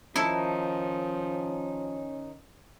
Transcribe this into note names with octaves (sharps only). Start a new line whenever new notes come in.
D#3 F3 C#4 D#4 E4 A4 A5